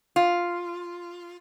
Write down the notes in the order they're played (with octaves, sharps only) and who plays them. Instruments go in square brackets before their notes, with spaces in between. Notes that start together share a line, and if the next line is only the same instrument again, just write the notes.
[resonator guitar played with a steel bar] F4